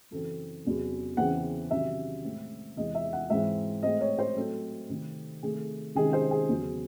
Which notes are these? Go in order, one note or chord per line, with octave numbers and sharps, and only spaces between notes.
F#2 C#3 E3 C4 A4
E2 C3 F#3 C#4
E2 C#3 E3 C4 F#5
C3 D#3 F#3 C#4 E5
A2 G#3 C4
E2 C3 E3 G#3 D#5
E5
F#5
G#2 E3 G#3 C4 E5
A2 G#3 C4 D#5
C#5
C5
A2 F#3 C4 A4
C3 D#3 A3 C4
C3 D#3 A3 G#4
C3 D#3 G#3 C#4 G#4
C5
G#4
E2 C#3 F#3